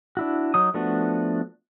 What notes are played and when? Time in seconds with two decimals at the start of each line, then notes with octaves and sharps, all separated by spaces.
0.17 D4 E4 F#4
0.54 F#3 D#4 D#6
0.74 F3 A3 B3 D4 F#4